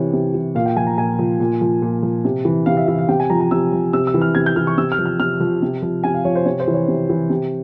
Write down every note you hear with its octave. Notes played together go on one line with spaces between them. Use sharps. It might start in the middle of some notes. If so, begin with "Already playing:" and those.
Already playing: C3 E3 C#5
C3
E3
A#2 F5
G5
F3 G#5
A#5
A#2 G#5
F3
A#2
F3
A#2
F3
C3
E3
C3 F5
E5
E3 E5
F5
C3 G5
G#5
F3 A#5
A#5
C3 E6
F3
C3 E6
E6
E3
F6
C3 G#6
G6
E3 F6
C#6
C3 E6
F6
F3
F6
C3 F6
F3
C3
F3
C3 G#5
F5
F3 C#5
C5
C3 C#5
C5
E3
C#5
C3
E3
C3